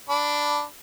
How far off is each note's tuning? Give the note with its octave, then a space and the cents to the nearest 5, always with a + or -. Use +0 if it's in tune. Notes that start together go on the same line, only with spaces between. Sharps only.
D4 +0 B5 +0